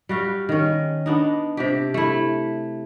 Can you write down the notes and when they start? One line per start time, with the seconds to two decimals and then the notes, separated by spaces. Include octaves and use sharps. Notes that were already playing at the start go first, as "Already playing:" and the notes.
0.09 G3 F#4 F5
0.49 D#3 C#4
1.06 B3 D4 D#4
1.57 C3 D4 G4
1.94 A3 E4